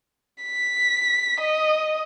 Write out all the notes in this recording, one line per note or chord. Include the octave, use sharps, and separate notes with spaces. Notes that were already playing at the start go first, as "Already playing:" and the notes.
B6
D#5